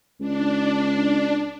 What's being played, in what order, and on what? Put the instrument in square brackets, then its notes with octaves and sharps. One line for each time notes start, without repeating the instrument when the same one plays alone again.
[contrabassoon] C#2 [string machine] D4